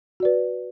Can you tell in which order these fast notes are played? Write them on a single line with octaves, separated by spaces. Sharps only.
F#4 D5 B4